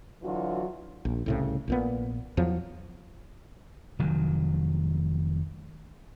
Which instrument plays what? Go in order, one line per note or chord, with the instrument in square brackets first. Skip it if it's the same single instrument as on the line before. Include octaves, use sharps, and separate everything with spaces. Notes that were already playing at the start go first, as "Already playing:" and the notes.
[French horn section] D3 E3 F#3 F4 F#4
[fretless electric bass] A#1
C2 A2 C#3
A#1 A#2 B3
E2 F3 F#3
[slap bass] F1 D#3 F#3